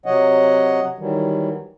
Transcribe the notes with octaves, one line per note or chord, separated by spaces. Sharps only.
C3 F#3 C#5 D#5 F#5
D#3 E3 F#3 G3